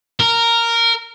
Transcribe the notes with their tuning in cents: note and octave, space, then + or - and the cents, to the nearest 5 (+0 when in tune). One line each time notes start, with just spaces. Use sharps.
A#4 -10